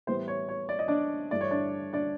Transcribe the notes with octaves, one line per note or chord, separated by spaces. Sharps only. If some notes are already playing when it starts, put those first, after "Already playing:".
A2 E3 G3 B3 C5
C#5
C#5
D5
D#5
D4 D5
G2 E3 A3 D5
C#5
D4 D5
D4 D5